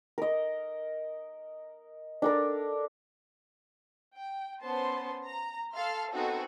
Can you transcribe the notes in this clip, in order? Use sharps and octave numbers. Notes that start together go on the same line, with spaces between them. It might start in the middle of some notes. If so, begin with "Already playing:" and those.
A#4 D#5
D4 A4 A#4
G5
B3 C#4 C5 A5 C6
A#5
A4 F5 A5 C6 F6
B3 C4 D#4 F#4 G#4 A4